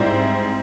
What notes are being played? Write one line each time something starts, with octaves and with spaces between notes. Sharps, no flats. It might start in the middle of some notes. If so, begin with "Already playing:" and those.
Already playing: G#2 G3 C4 E4